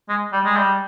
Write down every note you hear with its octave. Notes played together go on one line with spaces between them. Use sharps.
G#3
G3
G#3
G3